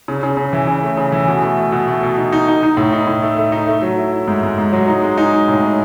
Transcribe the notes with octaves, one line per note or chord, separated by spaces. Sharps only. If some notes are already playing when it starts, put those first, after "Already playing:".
C#3
C#3
C#3
E3
C#3
A3
C#3
E3
B2
A3
A3
B2
A3
B2
D#4
D#4
D#4
D#4
A2
D#4
A2
A3
A3
D#4
A3
F#3
E4
E4
G#2
G#2
G#2
F#3
D#4
G#3
D#4
G#3
A2
G#3